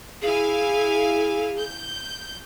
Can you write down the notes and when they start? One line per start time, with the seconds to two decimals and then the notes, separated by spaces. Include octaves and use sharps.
0.22 E4 G#4 F5 G#5
1.58 G6